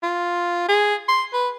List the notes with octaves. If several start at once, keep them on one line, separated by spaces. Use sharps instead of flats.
F4
G#4
C6
B4